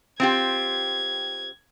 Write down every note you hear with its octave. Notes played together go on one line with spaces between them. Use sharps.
C4 F4 G4 G#6